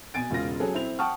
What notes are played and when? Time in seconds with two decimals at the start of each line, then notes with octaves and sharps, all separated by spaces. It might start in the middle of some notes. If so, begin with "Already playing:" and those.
0.14 B2 G#5 A6 D7
0.30 E1 C#3 F4 A#6
0.60 F#3 C#4 G#4 A4
0.74 C4 E4 C5 F7
0.99 F#5 G5 A5 C#6 D#6 F6